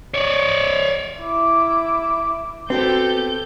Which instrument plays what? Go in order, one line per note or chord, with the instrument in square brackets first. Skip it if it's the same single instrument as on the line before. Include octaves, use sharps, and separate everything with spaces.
[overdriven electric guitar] C#5 D5
[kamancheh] E4 D6
[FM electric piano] B3 F#4 B4 [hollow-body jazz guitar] C4 [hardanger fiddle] G4 A4 [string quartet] G6